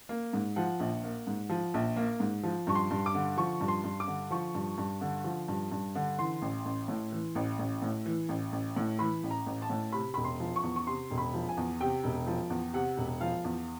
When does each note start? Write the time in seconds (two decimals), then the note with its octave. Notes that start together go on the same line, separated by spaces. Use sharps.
0.09 A#3
0.33 G#2
0.56 F3 F#5
0.80 A#1
1.03 A#3
1.27 G#2
1.49 F3
1.74 A#1
1.96 A#3
2.20 G#2
2.43 F3
2.67 G2 C#6
2.75 C6
2.91 G2
3.06 D6
3.15 D3
3.37 F3 C#6
3.61 G2
3.68 C6
3.84 G2
4.00 D6
4.08 D3
4.31 F3 C#6
4.55 G2
4.78 G2
5.01 D3
5.24 F3
5.48 G2
5.72 G2
5.95 D3
6.18 E3 C6
6.42 A1
6.65 A1
6.88 A2
7.12 E3
7.35 A1
7.59 A1
7.82 A2
8.06 E3
8.29 A1
8.52 A1
8.76 A2
8.99 E3 B5
9.23 A1
9.31 A#5
9.46 A1
9.62 A5
9.70 A2
9.92 C3 B5
10.14 E1 B5
10.24 C6
10.40 F3
10.56 C#6
10.63 E2
10.76 C#6
10.87 C3 C6
11.10 E1
11.18 B5
11.34 F3
11.49 G#5
11.57 E2
11.81 C3 G5
12.03 E1
12.27 F3
12.50 E2
12.74 C3 F#5
12.97 E1
13.21 F3 F5
13.44 E2